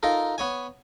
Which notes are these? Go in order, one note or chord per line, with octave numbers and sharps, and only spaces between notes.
D#4 F4 A4 A#4
B3 C#5 G#5